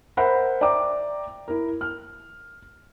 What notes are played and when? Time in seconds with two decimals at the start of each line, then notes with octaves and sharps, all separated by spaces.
0.17 A#4 C5 E5 F#5 B5
0.61 D5 E5 G5 A#5 D6
1.48 E4 A#4
1.81 F6